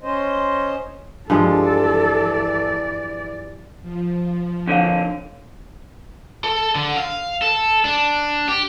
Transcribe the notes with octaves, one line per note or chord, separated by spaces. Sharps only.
C#4 C5 D#5
G2 E3 F3 G#3 A4 D5
F3
F2 D3 D4 C#5 F5
A4
D3
F5
A4
D4
G4